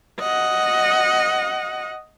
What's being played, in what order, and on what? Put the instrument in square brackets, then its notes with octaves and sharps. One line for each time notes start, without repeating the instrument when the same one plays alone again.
[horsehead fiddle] D#5 F#5